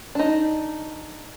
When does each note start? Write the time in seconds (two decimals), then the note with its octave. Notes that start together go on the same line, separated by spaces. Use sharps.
0.15 D4 D#4